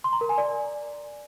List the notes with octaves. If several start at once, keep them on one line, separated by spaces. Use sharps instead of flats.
C6
A#5
A#4
G#5
D5